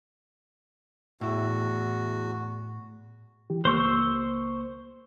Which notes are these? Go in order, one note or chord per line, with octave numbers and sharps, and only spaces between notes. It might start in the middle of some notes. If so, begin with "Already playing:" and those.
E2 A2 E4 F#4
E3 G4
C#2 A#3 C5 C#6 E6